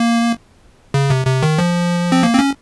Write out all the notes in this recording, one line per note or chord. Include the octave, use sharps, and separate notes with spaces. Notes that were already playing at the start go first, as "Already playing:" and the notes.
Already playing: A#3
C#3
C3
C3
D#3
F3
C4
A#3
C4
C#4